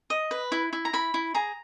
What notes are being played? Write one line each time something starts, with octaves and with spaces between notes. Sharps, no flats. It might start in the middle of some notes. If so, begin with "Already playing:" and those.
D#5
B4
E4
E4
A#5
E4 B5
E4
G#4 A#5